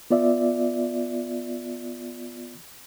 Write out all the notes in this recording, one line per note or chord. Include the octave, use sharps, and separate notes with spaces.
B3 F4 D5 E5